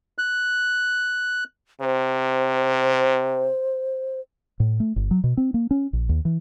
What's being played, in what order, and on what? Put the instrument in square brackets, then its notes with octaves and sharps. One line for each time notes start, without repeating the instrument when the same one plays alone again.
[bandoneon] F#6
[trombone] C3 [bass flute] C5
[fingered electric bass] A2
A3
G1
F#3
B2
C4
A#3
C#4
A#1
D#2
E3